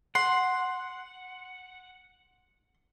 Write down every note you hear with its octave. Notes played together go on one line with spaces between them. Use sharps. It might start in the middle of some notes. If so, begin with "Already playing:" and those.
F#5 C6